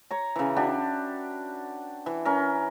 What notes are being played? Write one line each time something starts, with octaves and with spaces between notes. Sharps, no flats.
C#5 A#5
C#3 E3
D4 F#4 G4 B5
E3
C#4 A#4